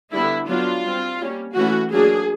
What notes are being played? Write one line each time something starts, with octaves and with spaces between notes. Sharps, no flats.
D3 G3 B3 D4 E4
F#3 B3 D4 F4
G3 C4
G3 A#3 C#4
E3 A3 C#4 F#4
F#3 A#3 D4 G#4